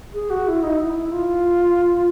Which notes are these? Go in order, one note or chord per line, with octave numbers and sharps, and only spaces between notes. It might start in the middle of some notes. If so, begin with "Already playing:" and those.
G#4
F#4
E4
D#4
E4
F4